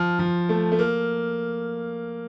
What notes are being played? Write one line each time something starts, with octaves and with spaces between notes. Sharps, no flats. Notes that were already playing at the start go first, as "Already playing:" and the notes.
Already playing: F3
F3
A3
A3
A#3